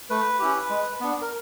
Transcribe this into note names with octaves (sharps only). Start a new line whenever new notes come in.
A3 B4
C#4 E4 G4
G#3
B3 D4
A#4